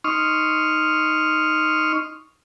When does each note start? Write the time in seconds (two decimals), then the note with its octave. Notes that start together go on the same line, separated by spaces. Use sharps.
0.04 D#4 C6 C#6 D#6 F6